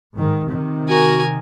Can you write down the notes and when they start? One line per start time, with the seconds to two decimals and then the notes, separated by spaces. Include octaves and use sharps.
0.16 G#2 D#3
0.46 C3 D#3
0.89 F#4 A#4 G#5